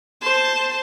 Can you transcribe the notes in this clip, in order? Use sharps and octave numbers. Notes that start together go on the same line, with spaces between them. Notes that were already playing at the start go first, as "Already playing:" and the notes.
C5 A5